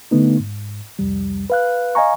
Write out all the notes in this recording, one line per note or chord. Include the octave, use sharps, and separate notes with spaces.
D3 A3 B3 D#4
G#2
C2 F2 G3
B4 F5 F#6
D#5 F5 G#5 A#5 C#6